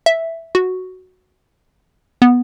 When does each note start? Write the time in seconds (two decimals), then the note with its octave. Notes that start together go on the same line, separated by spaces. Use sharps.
0.06 E5
0.55 F#4
2.22 B3